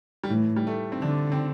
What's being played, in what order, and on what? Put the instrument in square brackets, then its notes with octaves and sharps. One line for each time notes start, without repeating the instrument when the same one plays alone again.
[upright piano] G3
[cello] A2 [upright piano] E3
[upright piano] G3
A3
C4
[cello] D3 [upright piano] D4
[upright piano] C4